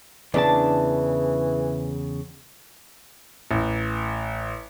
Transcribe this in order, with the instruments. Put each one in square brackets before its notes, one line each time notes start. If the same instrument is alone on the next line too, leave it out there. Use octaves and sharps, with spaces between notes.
[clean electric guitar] E2 C#3 A5 [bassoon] E3 [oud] D4
[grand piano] A1